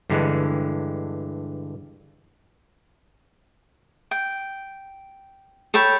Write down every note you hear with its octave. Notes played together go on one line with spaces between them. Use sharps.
G2 D3 E3 G#3
G5
A4 C#5 G5 B5